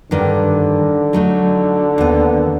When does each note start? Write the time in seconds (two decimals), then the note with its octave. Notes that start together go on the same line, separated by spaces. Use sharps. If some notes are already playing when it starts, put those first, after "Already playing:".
0.11 G2 D3 D#3
1.13 F#3 A3 D#4
1.98 D#2 B3